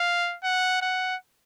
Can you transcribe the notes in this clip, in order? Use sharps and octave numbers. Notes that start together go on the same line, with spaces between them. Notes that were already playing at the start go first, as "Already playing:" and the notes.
Already playing: F5
F#5
F#5